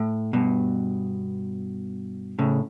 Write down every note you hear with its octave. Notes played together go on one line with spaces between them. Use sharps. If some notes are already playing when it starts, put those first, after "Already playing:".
Already playing: A2
G2 B2
A2 C#3